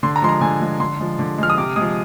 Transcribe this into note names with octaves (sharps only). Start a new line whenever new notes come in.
D3 C6
A#5
F3 G#3 C6
A#5
D3 G#5
F3 G#3
D3 C6
F3 G#3
D3
F3 G#3 F6
D#6
C3 D6
F3 G#3 D#6